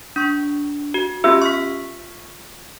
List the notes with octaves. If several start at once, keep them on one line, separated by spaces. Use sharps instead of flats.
D4 C#6
F#4
B3 C#4 F4 G4 E5 E6
C#6 F6 B6